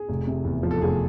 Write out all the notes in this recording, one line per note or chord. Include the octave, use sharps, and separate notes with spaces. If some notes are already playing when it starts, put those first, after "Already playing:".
Already playing: G#4
F1
C3
E2
F3
A4
F1 G#4